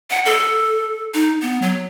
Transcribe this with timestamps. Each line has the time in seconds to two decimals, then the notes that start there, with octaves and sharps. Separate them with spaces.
0.10 F#5
0.25 A4
1.14 D#4
1.42 B3
1.62 F#3